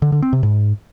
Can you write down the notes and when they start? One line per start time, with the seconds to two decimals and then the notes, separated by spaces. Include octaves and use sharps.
0.02 D3
0.12 D3
0.22 C4
0.33 C3
0.43 G#2